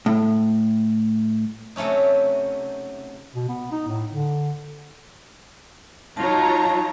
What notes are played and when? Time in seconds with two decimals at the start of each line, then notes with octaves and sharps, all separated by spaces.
0.06 A2
1.76 C3 F#3 A3 C#4 D#4
3.35 B2
3.49 B3
3.72 D#4
3.88 A2
4.12 D3
6.17 F#3 D#4 F4 C#5 A5 A#5